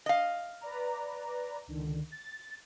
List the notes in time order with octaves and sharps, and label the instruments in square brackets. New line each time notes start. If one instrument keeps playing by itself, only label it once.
[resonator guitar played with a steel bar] D#5 F5
[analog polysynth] B4 D5 A#5
C#2 D3 D#3
A6